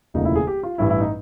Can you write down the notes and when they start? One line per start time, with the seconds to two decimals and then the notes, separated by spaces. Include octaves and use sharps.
0.14 E1 D2 C#3 F3 A#3 D#4
0.25 E4
0.36 G#4
0.47 G4
0.63 F4
0.78 A1 G2 E3 G3 E4
0.90 E4
1.01 D#4